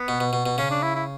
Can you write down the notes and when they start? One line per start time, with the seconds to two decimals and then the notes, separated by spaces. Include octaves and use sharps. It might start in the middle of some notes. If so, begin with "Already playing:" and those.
Already playing: B3
0.08 B2
0.20 B2
0.33 B2
0.46 B2
0.58 C#3 C#4
0.71 D4
0.83 E4
0.95 E4